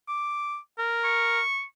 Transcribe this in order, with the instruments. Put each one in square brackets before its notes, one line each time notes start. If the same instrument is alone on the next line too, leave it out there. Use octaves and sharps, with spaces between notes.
[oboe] D6
A#4
[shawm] C#6